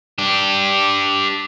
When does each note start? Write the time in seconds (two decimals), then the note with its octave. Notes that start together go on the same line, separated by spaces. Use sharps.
0.18 D4 G4